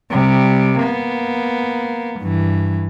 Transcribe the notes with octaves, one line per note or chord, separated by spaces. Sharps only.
C3 G3
A#3 B3
G2 E3